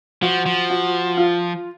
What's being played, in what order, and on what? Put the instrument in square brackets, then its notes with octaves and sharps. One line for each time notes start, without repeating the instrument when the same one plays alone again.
[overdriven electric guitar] F3 [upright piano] F#4
[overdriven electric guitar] F3
[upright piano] F#4
F4